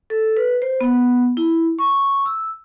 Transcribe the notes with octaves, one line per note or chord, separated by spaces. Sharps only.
A4
B4
C5
B3
E4
C#6
E6